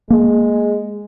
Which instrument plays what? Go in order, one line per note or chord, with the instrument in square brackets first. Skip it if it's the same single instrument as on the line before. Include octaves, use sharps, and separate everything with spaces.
[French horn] G#3 [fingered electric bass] A#3